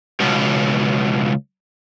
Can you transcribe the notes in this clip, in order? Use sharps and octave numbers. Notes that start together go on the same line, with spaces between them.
C#2 B2